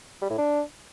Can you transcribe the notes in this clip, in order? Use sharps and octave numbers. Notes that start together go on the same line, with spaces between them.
G3
A2
D4